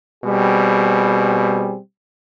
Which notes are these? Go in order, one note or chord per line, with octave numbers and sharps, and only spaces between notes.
B2 G3 C4 G#4